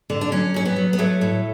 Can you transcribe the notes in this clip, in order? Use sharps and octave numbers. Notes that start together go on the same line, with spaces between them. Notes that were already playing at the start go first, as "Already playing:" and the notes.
D3
D4
F#3 C#4
F#3 C#4
B3
F#3
B3
F#3 A3
A2